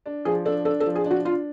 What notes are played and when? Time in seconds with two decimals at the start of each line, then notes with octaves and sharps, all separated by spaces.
0.06 D4
0.25 F3 G#4
0.45 D4 A4
0.65 D4 A4
0.80 A4
0.86 F3
0.95 G#4
1.06 D4
1.11 F#4
1.25 D4 F4